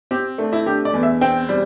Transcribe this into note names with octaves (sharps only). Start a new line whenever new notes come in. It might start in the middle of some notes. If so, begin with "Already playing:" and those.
C4 G4
A3 D4
E4
D3 G4
D5
E2
E5
C4 G5
G3